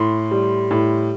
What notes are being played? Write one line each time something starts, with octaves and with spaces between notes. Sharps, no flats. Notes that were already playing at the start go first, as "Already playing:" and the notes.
Already playing: A2 C6
G3
A2